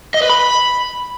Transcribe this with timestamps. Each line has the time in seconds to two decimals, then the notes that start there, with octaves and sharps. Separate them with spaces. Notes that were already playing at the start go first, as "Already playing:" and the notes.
0.14 D#5
0.22 B4
0.29 B5